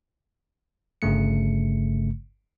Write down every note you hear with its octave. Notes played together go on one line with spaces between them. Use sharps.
G1 G2 C#3 A3 C#7